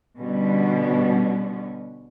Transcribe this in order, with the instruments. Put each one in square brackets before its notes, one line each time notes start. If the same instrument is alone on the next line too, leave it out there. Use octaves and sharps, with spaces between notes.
[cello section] B2 D3 G3 B3 C#4